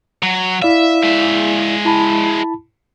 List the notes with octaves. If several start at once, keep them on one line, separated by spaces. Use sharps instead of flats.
F#3
E4 D5 E5 F5
G#3 E5
E4 A5 B5